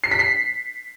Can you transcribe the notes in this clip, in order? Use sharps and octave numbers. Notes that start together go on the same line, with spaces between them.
C7
B6
C7